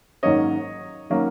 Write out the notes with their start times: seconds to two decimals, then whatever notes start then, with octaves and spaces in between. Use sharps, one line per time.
0.23 G#2 D#3 F#3 A#3 C#4 C#5 D#5
1.10 D#3 F#3 A#3 C#4